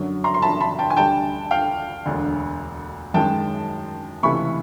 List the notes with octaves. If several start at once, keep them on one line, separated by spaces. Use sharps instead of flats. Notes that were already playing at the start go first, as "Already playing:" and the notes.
Already playing: F#2 D3 F#3
A#5 C6
C6
A5 B5
A5 B5
G5 A5
G#5
D2 D3 G3 G5 A5
F5 G5
E1 D2 D3
F#2 D#3 G#3 G5 A5
C#2 C3 E3 A3 B5 C#6